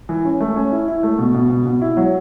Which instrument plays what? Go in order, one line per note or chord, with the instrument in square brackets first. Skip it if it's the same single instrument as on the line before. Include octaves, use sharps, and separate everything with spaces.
[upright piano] E3
C#4
A3
C#4
E4
E4
A3
B2
B2
B2
B2
E4
F#3